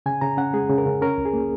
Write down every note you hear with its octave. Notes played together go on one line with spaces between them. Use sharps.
C#3 G#5
C#3 A#5
C#4 F#5
G#3 G#4
C#3
A#4
C#3
C#4 A#4
C#2
G#4
A#3